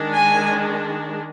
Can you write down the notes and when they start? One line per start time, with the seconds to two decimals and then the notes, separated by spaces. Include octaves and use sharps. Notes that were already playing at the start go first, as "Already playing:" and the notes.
Already playing: D#3 G#3 D4
0.12 G#5